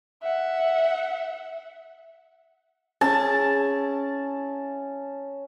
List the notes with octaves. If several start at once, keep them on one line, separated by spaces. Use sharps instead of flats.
E5 F#5
C#4 E4 G#4 A5